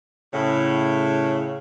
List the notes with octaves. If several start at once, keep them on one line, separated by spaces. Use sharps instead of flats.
A2 C#3